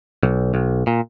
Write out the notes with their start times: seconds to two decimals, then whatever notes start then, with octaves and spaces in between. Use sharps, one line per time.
0.23 B1
0.54 B1
0.87 A#2